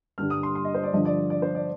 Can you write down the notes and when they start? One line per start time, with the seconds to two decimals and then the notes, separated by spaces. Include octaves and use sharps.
0.18 G2 D3 G3 F6
0.30 D#6
0.43 C6
0.55 C6
0.65 D#5
0.74 C5
0.83 D5
0.93 G2 D3 F3 D#5
1.05 D5
1.30 D5
1.42 C5
1.55 D5